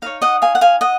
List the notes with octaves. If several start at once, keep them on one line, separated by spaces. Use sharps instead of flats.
D#4 A#4 C#5 F5
D#5 F#5
F5 G#5
F#5
F5 G#5
D#5 F#5